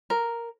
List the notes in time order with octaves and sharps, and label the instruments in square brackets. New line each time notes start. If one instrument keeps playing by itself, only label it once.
[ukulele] A#4